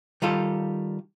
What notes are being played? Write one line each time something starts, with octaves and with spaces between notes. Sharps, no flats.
D#3 G3 F4 A4